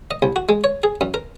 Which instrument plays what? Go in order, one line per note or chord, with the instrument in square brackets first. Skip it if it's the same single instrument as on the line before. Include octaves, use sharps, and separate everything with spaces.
[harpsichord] D#5
C2
F#4
G#3
C#5
G#4
F#2
A#4